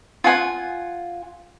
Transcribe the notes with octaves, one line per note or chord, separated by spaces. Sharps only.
F4 F#5 G#5